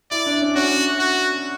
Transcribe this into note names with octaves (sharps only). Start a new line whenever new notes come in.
E4 D5
D4
C#4
C#4 F#4
F#4